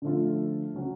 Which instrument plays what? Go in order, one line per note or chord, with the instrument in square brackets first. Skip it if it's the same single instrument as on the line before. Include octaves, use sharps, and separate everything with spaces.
[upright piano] D3 F3 A3 F4
C#3 F#3 C#4 F#4